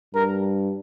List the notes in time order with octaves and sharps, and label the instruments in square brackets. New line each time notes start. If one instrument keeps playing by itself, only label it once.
[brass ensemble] G2 A#4